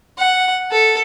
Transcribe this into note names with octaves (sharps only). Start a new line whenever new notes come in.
F#5
A4